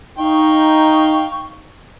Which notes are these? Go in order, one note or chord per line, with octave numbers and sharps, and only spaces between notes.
D#4 F5 G5 C#6